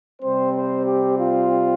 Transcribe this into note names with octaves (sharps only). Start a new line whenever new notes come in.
C3 G3 C4 C5
C5
G4
F4